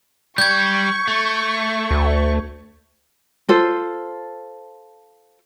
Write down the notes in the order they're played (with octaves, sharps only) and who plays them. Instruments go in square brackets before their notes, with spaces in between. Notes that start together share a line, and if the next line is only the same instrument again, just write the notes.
[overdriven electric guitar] G3 [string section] C#6 [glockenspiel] G6 G#6
[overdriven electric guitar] A3
[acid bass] D2
[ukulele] F4 A4 C5